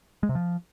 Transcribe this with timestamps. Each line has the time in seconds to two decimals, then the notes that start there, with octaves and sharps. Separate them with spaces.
0.23 G#3
0.29 C3
0.35 F3